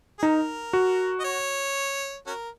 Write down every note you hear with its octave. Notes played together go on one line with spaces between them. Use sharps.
G#4
D#4 A#4
F#4
D#5
C#5
C#4 F#4 A#4